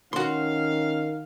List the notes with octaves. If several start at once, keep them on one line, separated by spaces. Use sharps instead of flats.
D#3 C#4 F#4 F5 C6